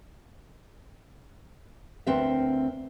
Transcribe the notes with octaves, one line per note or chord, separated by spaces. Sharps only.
D2 C4 A#4 B4 E5